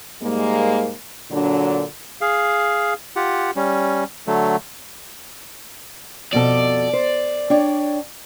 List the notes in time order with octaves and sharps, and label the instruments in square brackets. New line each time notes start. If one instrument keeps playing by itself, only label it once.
[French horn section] G#2 G3 G#3 A#3
A#2 D3 F#3 D4
[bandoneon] G#4 F5
F4 G4 F#5
G3 C#4
D3 F#3 A3
[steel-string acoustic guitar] F2 B2 A4 [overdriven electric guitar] D5
[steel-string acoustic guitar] C5
D4 C#5 G5